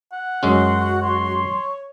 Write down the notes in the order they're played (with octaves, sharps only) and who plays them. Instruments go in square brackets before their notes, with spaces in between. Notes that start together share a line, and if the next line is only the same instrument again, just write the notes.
[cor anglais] F#5
[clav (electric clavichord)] F#2 G#3 C#4 [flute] F#4 [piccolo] C6
[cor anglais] C#5 [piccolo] C6